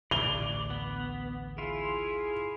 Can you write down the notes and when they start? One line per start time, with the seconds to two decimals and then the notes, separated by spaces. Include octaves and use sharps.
0.11 A1 D2 A2 D5 F7 G7
0.70 B3
1.58 E4 F4 G#4